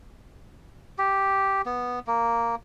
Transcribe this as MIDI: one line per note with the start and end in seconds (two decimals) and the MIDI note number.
0.99 1.62 67
1.66 1.99 59
2.07 2.55 58